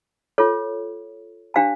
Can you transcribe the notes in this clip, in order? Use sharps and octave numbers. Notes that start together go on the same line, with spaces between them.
F4 A4 C#5
D4 G4 C5 F5 A5